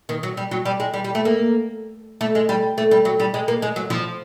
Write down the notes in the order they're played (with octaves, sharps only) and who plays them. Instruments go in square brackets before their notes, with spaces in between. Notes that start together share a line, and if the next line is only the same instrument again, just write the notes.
[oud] D#3
F#3
G3
F#3
G3
G#3
G3
G3
A3
A#3
A3
G#3
G3
A3
G3
F#3
G3
G#3
A#3
G#3
F#3
F3